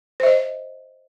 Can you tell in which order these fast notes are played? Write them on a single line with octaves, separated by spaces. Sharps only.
C5 E5 D#5